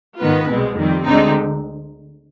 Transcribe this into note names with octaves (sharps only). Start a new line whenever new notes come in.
G#2 D#3 B3 F4 B4
C2 B2 G#3 C4
F2 D#3 G3 C4
D2 D3 G#3 C4 D#4